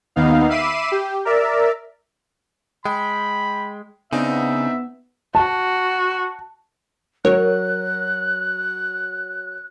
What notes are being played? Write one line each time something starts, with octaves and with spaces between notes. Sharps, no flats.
D#2 B3 D#4 F5
E5 B5 D6 C7 D#7 E7
G4
A#4 D5 E5
G#3 G5 B5
C#3 B3 C4 D4 D#4 E5
F#4 A5
F#3 A#4 C#5 F#6